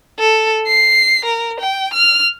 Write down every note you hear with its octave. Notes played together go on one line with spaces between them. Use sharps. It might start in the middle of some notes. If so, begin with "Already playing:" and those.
A4
C7
A#4
G5
F6